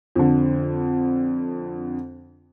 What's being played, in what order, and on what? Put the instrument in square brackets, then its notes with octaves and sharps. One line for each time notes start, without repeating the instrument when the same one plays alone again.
[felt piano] F2 D3